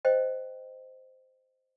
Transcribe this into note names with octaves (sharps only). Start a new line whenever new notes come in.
C5 D#5 G5